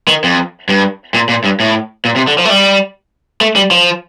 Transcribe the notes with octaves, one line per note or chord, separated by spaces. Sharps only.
D#3
F2
G2
A#2
A#2
G2
A2
A#2
C3
D3
F3
A3
G3
A3
G3
F3